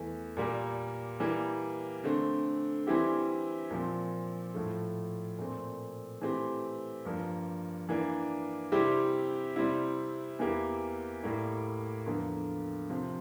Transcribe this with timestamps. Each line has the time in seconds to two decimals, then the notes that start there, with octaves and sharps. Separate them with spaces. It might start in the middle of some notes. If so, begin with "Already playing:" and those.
Already playing: E2 E3 A3
0.37 A#2 G3 A#3
1.20 E3 G3 A#3
2.04 D3 A3 C4
2.87 E3 G3 C4 E4 G4
3.71 A#2 F3 C4
4.54 A2 F3 A3
5.38 A#2 A3 C4
6.21 E3 A3 C4 G4
7.05 G2 F3 A#3
7.89 E3 A#3 D4
8.72 C3 G3 C4 E4 G4
9.56 C3 G3 C4 E4
10.39 E2 E3 A#3 E4 G4
11.23 A2 G3 A#3 E4
12.06 E2 D3 F3 A#3 F4
12.90 C3 F3 C4